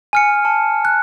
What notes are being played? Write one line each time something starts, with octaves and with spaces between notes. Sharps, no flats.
G#5 F6 C#7
A5
F#6